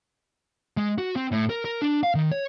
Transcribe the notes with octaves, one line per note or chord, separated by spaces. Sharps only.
G#3
F#4
C4
A2
A#4
A#4
D4
F5
D#3
C#5